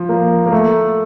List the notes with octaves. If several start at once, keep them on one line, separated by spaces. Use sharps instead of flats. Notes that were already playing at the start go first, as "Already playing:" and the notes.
Already playing: F3
A#3
A#3
A3